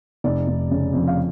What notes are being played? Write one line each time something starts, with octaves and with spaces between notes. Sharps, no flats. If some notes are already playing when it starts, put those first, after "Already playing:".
F1 D5
F1
C#3
F2
F5